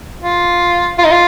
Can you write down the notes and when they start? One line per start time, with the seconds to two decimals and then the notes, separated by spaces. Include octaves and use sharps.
0.23 F4
0.98 F4
1.05 D#4
1.11 F4